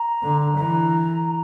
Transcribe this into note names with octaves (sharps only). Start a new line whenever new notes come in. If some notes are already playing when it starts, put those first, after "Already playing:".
Already playing: A#5
D3
E3 A#5